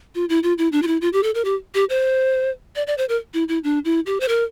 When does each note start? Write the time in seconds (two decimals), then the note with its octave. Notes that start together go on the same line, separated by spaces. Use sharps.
0.15 F4
0.29 E4
0.43 F4
0.58 E4
0.72 D4
0.82 F4
0.87 E4
1.01 F4
1.13 G4
1.23 A4
1.35 A#4
1.45 G4
1.74 G4
1.89 C5
2.76 D5
2.87 D5
2.98 C5
3.09 A#4
3.34 E4
3.48 E4
3.64 D4
3.85 E4
4.06 G4
4.20 C5
4.28 A#4